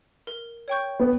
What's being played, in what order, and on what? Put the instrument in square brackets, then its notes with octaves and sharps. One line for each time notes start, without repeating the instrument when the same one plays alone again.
[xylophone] A#4
C#5 G5 C#6 G6
[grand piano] B3